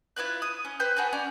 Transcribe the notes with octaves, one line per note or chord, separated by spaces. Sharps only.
E4 F4 B4 F#6
D#6
C#4
B4 C5 E5 G5
F#4 G#4 A4 B4
C#4 D5